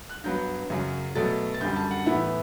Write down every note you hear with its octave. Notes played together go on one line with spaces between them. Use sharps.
F#6
G2 F#3 B3 G6
F#2 C#3 F#3
B2 F#3 A3 A6
A6
F#2 D3 G3 G6
A5
F#5
A2 E3 B3 E5